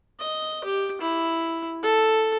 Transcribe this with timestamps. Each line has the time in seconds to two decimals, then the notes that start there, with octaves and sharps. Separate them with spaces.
0.20 D#5
0.64 G4
1.01 E4
1.83 A4